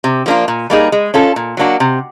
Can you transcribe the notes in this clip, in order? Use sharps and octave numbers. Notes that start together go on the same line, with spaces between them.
C3
F3 A#3 D4 F4
A#2
G3 A#3 D#4 G#4
G#3
C#4 F4 A4
A#2
F#3 A#3 D4 F#4
C3